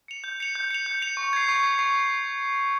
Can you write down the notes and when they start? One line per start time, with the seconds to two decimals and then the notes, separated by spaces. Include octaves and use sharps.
0.08 C#7 F7
0.24 G6
0.40 C#7 F7
0.55 G6
0.70 C#7 F7
0.86 G6
1.02 C#7 F7
1.17 C#6
1.33 G#6 C7
1.49 C#6
1.63 G#6 C7
1.79 C#6